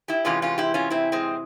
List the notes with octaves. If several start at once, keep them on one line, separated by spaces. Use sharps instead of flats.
E4 G4
E2 C3 E3 G#3 C#4 F4
C#4 F4
E4 G4
C#4 F4
C4 E4
G#3 C4